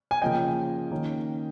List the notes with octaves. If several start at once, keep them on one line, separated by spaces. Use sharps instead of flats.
G#5
C#3 F3 A#3 C#4 D#5 G5
D#3 A#3 C#4